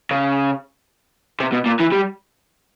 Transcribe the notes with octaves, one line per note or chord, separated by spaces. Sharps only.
C#3
C3
B2
A#2
E3
G3